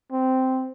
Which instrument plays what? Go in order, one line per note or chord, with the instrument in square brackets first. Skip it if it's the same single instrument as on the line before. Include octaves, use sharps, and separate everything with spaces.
[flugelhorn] C4